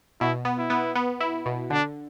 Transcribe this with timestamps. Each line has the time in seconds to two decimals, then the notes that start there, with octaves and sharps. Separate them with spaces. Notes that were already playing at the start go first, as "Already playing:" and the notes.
0.20 B2 E4
0.45 B3
0.59 E4
0.70 B3
0.95 B3
1.20 E4
1.46 B2
1.70 D3 D4